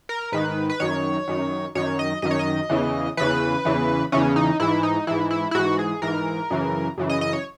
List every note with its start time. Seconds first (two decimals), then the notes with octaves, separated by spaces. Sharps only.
0.09 A#4
0.32 G#2 D#3 B4
0.70 B4
0.80 F#2 D#3 C#5
1.28 F#2 D#3
1.75 F#2 D#3 C#5
1.99 D#5
2.22 F#2 D#3 D#5
2.31 C#5
2.39 D#5
2.69 E2 C#3 E3
3.17 E2 C#3 E3 B4
3.65 E2 C#3 E3
4.12 E2 C#3 E3 C#4
4.36 D#4
4.60 G#2 E3 E4
4.83 D#4
5.07 G#2 E3 E4
5.31 E4
5.51 E4
5.55 G#2 E3 F#4
5.79 G#4
6.02 G#2 E3 A#4
6.50 F#2 C#3 E3
6.98 F#2 C#3 E3
7.10 D#5
7.21 D#5
7.33 C#5